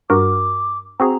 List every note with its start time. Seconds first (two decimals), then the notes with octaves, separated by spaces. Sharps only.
0.10 G2 F#4 A#4 D6
1.00 C4 F#4 G#4 A#5